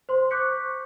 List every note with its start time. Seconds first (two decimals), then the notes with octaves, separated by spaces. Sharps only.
0.09 C5 C6
0.31 C#6 D6 F#6 G6 B6 C#7